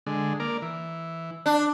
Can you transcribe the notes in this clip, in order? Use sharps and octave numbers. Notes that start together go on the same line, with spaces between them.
D3 G#3
A#3 A#4 D5
E3
D4